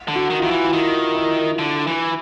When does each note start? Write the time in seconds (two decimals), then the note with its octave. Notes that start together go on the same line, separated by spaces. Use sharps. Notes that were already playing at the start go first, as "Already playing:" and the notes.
0.08 D3
0.16 F#4
0.30 D#3
0.39 F4
0.42 D#3 E4
0.51 E3
0.64 E4
0.72 D#3 F4
1.15 E4
1.59 D3
1.87 E3